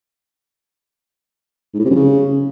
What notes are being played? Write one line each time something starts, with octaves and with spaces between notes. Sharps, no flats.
G#2
A2
C3
F#2
C#3